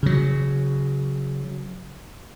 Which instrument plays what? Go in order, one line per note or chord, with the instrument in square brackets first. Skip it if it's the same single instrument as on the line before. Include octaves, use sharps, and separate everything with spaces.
[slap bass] C#3 F#3